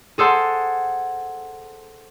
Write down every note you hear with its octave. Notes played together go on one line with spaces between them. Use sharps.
G#4 A4 C5 F#5